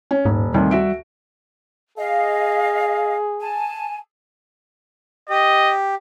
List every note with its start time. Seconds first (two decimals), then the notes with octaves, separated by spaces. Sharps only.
0.11 C#4
0.25 D#1 G#2
0.54 D2 C3 D#3 G3
0.71 F#4 E5 D7
1.97 G#4 D#5 F5
3.40 G#5 A5
5.29 G4 D#5